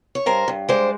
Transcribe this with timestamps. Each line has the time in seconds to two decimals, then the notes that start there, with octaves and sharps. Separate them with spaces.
0.15 C#5
0.26 G2 A#4 C5
0.48 G2
0.69 G#3 C5 D5